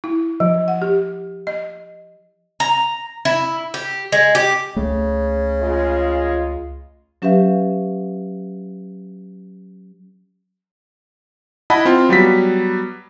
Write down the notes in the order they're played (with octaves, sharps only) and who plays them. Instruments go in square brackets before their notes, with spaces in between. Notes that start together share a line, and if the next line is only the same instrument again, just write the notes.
[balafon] E4
F3
F#5
G4
D#5
[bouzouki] A#5
E4
G4
G#3
G4
[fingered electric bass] C#2 A3 [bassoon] C#3
[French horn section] G#3 F4
[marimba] F#3 C#4 G4 B4 E5 F5
[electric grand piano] E4 D#5 F#5 A5 B5
C4 F4
F#3 G3 B3 B6